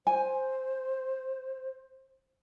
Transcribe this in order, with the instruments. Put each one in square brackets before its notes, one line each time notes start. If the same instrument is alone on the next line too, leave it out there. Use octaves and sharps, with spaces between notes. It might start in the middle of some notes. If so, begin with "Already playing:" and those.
[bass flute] C5 [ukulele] G#5